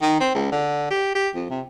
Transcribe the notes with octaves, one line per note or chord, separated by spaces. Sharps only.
D#3
C4
C#2
D3
G4
G4
F2
C3